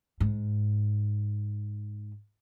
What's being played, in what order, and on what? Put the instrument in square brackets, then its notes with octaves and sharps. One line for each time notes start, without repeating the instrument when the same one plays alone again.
[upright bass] G#2